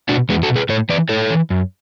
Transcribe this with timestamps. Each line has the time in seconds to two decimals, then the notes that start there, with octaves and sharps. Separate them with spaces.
0.09 B2 D4 F#4
0.29 E2 G#3 B3
0.43 F#4 A4
0.49 B2
0.56 G#4 B4
0.69 A2 A4 C#5
0.89 E3 B4 D5
1.09 A2 A4 C#5
1.30 E3
1.50 F#2